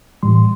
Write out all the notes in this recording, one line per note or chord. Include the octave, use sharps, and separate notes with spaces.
A2 E3 G3 C6